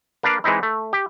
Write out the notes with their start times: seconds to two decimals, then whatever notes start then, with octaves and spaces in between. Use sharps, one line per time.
0.23 A#3 D4 B4 D5 F5
0.44 E3 G#3 C4 D#4 E4
0.63 A3
0.93 G4